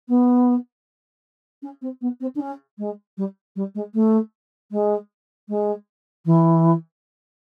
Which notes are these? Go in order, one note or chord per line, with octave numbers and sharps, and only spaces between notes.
B3
C#4
C4
B3
C4
D4
C#4
G#3
G3
G3
G#3
A3
G#3
G#3
E3